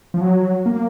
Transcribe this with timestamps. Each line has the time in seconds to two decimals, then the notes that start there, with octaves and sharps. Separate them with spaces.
0.14 F3
0.21 F#3
0.66 A#3